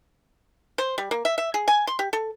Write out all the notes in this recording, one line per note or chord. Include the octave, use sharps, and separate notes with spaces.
C5
G3
A#3
E5
E5
G#4
G#5
C6
G4
A4